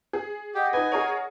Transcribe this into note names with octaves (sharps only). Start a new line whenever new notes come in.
G#4
G4 D#5 F#5 D#6
D#4 B4 G#5
G#4 A#4 C#5